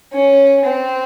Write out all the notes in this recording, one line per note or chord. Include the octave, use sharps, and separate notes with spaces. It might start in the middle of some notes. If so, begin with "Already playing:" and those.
C#4
C4